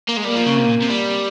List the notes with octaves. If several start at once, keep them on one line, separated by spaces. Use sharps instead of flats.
A#3
G#3
G3 A#3
F3
C#3
C3
A#2
C3
G3